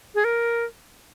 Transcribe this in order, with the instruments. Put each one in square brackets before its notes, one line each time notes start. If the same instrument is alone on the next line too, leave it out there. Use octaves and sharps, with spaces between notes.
[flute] G#4
A#4